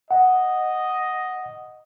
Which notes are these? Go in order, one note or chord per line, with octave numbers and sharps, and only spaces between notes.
D#5 F#5